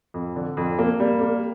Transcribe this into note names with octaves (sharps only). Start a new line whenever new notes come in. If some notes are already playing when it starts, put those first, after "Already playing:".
F2
D3
F2
A#3
G3
A#3